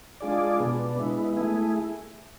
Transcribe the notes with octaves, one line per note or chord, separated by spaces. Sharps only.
G#3 D4 F4 G#4 D5
B2 B3 D4
G#3 B3 E4
A3 E4 G#4